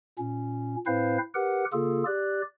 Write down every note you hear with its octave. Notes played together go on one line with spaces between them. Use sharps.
A#2 C#4
A2 C4 E4 B4 C5 F5
G4 A#4 B4 F#5
C#3 A#3 F4 G#4 A4
G4 D5 F#6